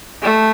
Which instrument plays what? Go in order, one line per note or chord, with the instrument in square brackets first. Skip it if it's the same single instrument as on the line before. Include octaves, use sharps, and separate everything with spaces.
[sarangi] A3